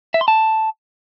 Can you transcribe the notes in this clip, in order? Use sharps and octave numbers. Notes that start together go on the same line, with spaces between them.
E5
C6
A5